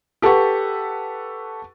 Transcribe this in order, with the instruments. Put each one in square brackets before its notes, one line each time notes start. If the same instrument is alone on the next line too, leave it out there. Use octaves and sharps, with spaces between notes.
[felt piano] G4 A4 B4 F#5 C#6